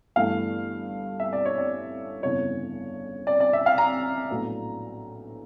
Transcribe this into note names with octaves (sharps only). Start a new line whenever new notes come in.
G1 G2 E3 A3 F5
E5
D5
C#5
D5
G1 F2 C#3 E3 C#5
D5
D5
E5
F5
A#5
A#1 A2 F#3 B3